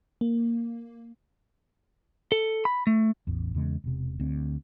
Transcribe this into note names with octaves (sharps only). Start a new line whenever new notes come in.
A#3
A4
B5
A3
A1 E2
E2 C#3 G#3
E1 C3
D2 C4